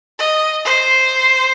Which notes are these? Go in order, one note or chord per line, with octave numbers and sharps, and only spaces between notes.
D#5
C5